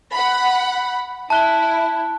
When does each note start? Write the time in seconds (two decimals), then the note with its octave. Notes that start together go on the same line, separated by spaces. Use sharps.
0.13 F#5 B5
1.30 E4 A5 F#6 G7